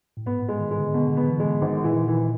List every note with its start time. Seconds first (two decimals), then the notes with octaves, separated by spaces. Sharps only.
0.17 A2
0.26 G#2 B3
0.42 A2
0.49 G#3
0.60 D#3
0.71 G#3
0.77 D3
0.94 B2 D3
1.17 B3
1.27 E3
1.40 G#3
1.62 G#1 D#3
1.84 A#2 E3
2.07 A#2 E3